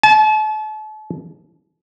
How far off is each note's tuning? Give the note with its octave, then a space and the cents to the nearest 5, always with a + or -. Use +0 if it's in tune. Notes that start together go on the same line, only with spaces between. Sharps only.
A5 -35